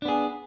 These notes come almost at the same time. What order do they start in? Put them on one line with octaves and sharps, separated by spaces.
D4 B3 G#4